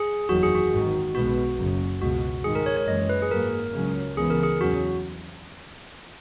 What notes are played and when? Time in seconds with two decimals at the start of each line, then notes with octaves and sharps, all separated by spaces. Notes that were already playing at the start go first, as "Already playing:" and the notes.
Already playing: G#4
0.29 F#1 E2 D#3 F#3 F#4
0.43 G#4
0.55 F#4
0.72 G#1 G#2 D#3
1.15 B1 B2 G#3 B3 F#4
1.58 F#1 F#2 C#3
2.02 C#2 B2 G#3 F#4
2.44 G#2 D#3 G#3 G#4
2.55 A#4
2.66 C#5
2.76 C#5
2.88 F#1 F#2 E3 G#3 D#5
3.09 B4
3.22 G#4
3.31 G#2 F#3 A#3 A#4
3.74 C#2 C#3 F#3 C#4
4.17 C#2 C#3 E3 B3 G#4
4.30 A#4
4.43 G#4
4.60 E2 C#3 F#3 C#4 F#4